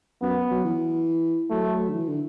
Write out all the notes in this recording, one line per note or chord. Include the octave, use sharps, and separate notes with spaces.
F#2 B3
F#3
E3
F#3 A3
D3
E3
D3